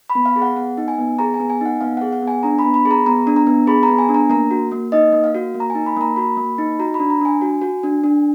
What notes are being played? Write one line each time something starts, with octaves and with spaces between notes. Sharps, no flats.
B5
B3
F5
G#4
F#5
B3 F#5
D#4
G#5
B3
G#4 A#5
G#5
B3
G#5
D#4 F#5
B3 F5
G#4 F#5
F#5
B3 G#5
D4 A#5
B5
B3
B5
G#4
A#5
B3 A#5
D4
A#5
B3
G#4 B5
A#5
B3
G#5
D4
A#5
A#3 A#5
F#4
A#3
D#4 D#5
A#3
F5
F#4
A#3
A#5
D#4 G#5
B5
A#3 A#5
F#4 B5
A#3
D#4
F#4 A#5
B5
D4
A#5
D4 G#5
F#4
F#4
D4
D4